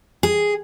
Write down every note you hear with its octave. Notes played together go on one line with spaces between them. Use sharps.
G#4